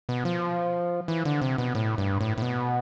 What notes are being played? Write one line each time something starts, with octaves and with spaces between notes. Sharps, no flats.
B2
F3
E3
D3
C3
B2
A2
G2
A2
A2
B2